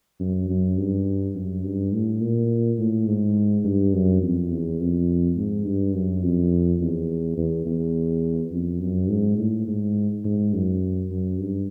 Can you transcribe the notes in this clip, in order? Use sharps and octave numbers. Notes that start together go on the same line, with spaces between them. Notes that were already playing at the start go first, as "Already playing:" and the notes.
F#2
F#2
G2
F#2
G2
A2
A#2
A2
G#2
G2
F#2
F2
E2
F2
G#2
G2
F#2
F2
E2
E2
E2
F2
F#2
G#2
A2
G#2
G#2
F#2
F#2
G2